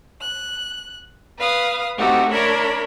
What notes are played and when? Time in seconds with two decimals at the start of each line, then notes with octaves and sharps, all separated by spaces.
0.21 F#6
1.37 B4 F5 D#6
1.97 A3 C4 D#4 F#4 G4 A4
2.31 D4 A#4 C#5 E5 B5